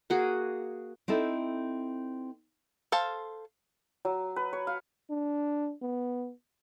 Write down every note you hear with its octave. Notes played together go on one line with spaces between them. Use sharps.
A#3 F#4 G#4
C4 D#4 E4 A4
A4 C5 F5 A5
F#3
B4
C#5
F5
D4
B3